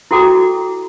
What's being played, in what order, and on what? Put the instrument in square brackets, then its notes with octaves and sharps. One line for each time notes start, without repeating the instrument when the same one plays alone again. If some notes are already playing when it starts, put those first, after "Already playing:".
[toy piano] E4 F#4 A4 G5 D6